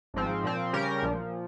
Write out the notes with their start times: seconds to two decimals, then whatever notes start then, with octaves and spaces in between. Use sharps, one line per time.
0.14 G#1 G#2 F3 C4
0.44 A#2 F3 C4
0.73 C#3 G3 C#4 G4 A#4
1.02 A#1 A#2 F3